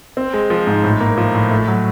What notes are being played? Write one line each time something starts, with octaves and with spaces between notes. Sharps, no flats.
C4
G#3
F3
G#2
A2
A#3
F3
A2
A3
F#3